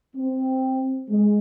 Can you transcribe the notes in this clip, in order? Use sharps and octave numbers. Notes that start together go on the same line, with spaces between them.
C4
G#3